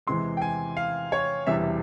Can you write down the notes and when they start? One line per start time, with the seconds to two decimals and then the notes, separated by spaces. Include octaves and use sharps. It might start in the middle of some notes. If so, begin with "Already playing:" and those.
0.07 E2 C3 E3 G#3 C6
0.37 G5
0.42 G#5
0.77 F5
1.12 C#5
1.47 E1 E2 C3 E3 G3 E5